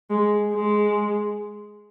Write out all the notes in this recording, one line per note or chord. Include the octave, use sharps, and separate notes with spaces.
G#3
G#3